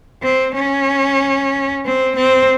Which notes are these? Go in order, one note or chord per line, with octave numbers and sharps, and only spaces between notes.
C4
C#4
C4
C4